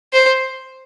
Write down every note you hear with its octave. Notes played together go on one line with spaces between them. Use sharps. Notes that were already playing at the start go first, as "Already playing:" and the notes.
C5